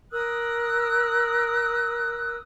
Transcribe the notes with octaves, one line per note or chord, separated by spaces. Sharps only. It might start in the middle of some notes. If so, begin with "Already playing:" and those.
A#4 D#6 E6 F#6